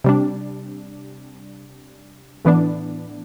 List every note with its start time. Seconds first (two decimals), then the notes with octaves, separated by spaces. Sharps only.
0.04 C3 G3 D4
2.45 A2 E3 B3 D4